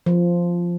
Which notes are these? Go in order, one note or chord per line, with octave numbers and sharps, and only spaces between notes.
F3